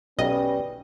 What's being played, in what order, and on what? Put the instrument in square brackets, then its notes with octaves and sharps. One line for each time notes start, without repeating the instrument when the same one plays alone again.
[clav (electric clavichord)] B1 [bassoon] G3 [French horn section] C#4 B4 [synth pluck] D#5